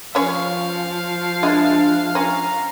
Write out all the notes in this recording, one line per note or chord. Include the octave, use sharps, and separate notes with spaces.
F3 C#4 C#5 F5
G#3 D4 E4
C#4 A#5